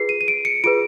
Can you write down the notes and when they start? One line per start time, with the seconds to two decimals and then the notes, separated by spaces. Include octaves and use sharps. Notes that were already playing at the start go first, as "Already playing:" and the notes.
Already playing: F4 G#4 B4 C7
0.09 D#7
0.21 D#7
0.28 D7
0.45 C#7
0.64 F4 G#4 B4 D7